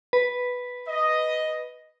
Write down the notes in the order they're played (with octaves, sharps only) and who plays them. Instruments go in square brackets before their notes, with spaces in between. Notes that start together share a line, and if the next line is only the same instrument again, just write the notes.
[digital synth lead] B4
[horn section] D#5